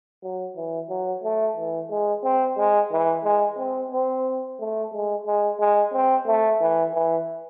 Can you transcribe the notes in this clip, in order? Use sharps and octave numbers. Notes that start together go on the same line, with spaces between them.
F#3
E3
F#3
A3
E3
G#3
C4
G#3
E3
G#3
C4
C4
A3
G#3
G#3
G#3
C4
A3
E3
E3